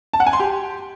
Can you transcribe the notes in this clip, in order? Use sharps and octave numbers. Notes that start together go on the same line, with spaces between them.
A5
F#5
G#5
C6
G4